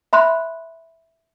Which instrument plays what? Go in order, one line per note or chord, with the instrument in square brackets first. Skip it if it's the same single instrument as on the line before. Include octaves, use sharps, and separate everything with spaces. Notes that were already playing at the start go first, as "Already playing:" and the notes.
[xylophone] E5 B5 C6 F#6